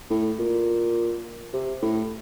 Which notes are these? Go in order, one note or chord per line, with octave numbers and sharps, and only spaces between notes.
A2
A#2
C3
A2